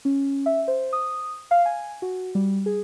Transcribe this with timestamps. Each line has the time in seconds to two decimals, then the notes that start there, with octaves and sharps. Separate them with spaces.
0.05 C#4
0.46 E5
0.68 C5
0.93 D#6
1.51 F5
1.65 G#5
2.02 F#4
2.35 G3
2.66 G#4